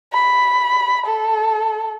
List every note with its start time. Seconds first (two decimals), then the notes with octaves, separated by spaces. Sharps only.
0.13 B5
1.06 A4